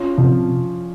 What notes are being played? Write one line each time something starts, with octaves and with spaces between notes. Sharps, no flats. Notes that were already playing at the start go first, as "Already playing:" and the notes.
Already playing: C#4 F4
C3 F3